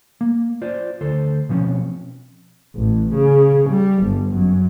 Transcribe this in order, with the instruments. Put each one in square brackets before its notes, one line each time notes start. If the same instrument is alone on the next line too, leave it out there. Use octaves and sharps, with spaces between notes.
[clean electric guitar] A#3
F4 C5 D5
D2 A4 C5
B2 F3 C4 C#4
[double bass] A1
C#3
G3
G1
F#2